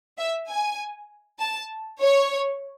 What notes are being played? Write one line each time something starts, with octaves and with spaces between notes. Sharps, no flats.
E5
G#5
A5
C#5